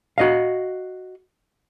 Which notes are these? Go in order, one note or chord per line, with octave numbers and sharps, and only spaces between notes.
F#4 D#5 F5